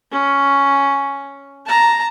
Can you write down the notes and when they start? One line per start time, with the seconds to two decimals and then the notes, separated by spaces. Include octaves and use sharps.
0.11 C#4
1.66 A5 A#5